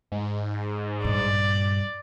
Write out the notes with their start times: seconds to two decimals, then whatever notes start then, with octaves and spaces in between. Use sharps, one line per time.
0.12 G#2
1.04 A#1 G2 D5